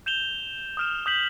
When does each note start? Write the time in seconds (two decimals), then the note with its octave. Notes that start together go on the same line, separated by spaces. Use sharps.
0.06 G6 E7 F7 G7
0.77 D#6 F6 E7
1.06 D#6 G6 B6 F#7